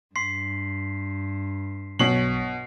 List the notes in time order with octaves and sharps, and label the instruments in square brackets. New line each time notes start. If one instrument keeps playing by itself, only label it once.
[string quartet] G2 [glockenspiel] C6 B6 C7
[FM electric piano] B1 C#5 B6 [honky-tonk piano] B2 F#7 [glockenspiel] C7